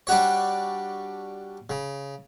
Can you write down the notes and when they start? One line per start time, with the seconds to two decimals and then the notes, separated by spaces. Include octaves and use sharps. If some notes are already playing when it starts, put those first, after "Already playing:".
0.07 G3 D4 F#4 C#5
1.70 C#3